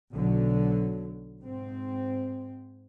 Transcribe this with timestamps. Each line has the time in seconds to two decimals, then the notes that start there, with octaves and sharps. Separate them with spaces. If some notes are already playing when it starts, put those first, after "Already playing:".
0.13 B1 D3 F#3
1.42 G#2 C4